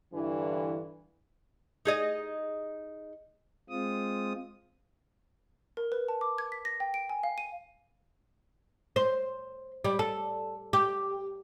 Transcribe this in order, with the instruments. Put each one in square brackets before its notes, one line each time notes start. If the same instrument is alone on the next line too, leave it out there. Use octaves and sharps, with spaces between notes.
[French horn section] G2 D3 E3
[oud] D#4 G#4 D#5
[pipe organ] G#3 C4 F4 D#6
[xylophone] A#4
B4
A5
D6
G#6
B6
A#6
G5
D7
G#5
F5
D#7
[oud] C5
G3
A4
G4